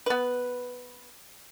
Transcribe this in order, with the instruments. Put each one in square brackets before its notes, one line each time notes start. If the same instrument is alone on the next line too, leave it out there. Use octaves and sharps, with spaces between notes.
[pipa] B3 B4